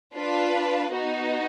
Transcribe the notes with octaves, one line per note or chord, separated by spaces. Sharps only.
D4 F4 B4
B3 D#4 F#4